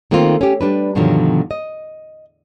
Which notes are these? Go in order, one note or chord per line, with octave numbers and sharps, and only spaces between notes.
D#3 A3 A#3 C4 D#4 F4
C#4 G4
G3 D4 B4
G2 B2 D3 D#3 F3 F#3
D#5